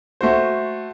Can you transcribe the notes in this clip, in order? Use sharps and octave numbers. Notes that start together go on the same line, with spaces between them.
A3 F#4 C5